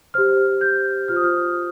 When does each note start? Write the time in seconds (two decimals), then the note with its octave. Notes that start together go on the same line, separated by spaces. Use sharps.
0.14 G4 C5 F6
0.61 G6
1.08 F4 C5 F6
1.16 D#6
1.24 F6